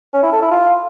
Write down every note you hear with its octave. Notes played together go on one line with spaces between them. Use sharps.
C#4
E4
A4
E4
F4